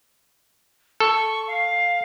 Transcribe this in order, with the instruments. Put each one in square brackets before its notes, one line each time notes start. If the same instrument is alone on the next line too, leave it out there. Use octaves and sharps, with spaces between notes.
[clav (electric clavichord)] A4 [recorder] C#6
[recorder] F5